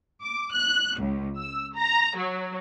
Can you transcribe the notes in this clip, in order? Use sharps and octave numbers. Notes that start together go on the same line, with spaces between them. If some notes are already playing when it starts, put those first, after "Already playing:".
D6
F#6
C#2
E6
A#5
F#3